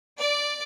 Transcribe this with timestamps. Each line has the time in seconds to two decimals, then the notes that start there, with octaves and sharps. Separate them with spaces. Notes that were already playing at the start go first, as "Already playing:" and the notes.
0.19 D5